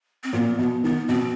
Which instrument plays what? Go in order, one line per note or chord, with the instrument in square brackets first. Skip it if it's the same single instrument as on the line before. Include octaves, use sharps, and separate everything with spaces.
[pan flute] C4
[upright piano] A#2 [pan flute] B3
[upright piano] B2 [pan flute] B3
[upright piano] D#3 [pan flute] B3
[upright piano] B2 [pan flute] C4